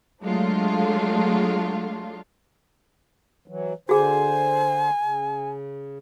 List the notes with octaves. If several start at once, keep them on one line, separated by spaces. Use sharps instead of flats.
F#3 G#3 A3 D4 F4
E3 F#3
D3 F#4 G#4 C5 G#5
C#3